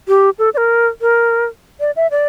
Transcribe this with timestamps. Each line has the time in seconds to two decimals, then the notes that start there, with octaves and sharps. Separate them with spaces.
0.08 G4
0.39 A4
0.54 D5
0.57 A#4
1.01 A#4
1.80 D5
1.96 E5
2.11 D5